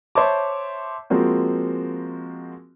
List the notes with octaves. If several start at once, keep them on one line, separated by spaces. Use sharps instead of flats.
C5 C#5 E5 A5 D6
F3 G#3 A#3 C4 F#4